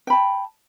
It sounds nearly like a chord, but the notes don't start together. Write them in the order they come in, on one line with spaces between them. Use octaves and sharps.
G5 B5 A5